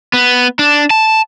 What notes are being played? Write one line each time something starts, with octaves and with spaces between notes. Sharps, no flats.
B3
D4
A5